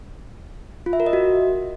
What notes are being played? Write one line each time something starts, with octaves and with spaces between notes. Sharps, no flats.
F4
E5
A#4
D#5
F#4